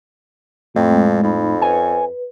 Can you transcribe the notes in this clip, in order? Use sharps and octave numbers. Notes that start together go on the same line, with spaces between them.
F2 A2 A3 C4 G5
G#3
F2 D#4 B5
B4 C#5 G#5